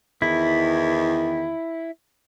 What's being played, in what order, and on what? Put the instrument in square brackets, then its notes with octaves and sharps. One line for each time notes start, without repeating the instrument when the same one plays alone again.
[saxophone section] E2 D#3 [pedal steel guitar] E4